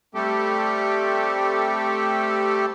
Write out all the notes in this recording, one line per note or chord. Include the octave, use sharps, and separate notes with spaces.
G3 A3 C4 G4 A4